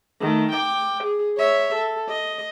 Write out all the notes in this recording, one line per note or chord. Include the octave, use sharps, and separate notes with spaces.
D#3 A3
G5 D6
G#4
C#5 E5
A4
D#5